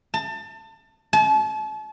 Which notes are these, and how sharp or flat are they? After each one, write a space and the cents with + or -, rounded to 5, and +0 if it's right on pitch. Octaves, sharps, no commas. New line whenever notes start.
A5 +30
A5 -35